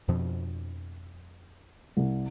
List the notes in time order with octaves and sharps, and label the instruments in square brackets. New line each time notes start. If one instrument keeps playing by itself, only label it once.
[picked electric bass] F2 B2 F3
[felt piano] C2